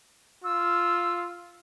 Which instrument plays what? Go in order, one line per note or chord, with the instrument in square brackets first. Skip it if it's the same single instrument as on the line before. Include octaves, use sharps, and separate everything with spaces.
[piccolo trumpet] F4 [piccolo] E6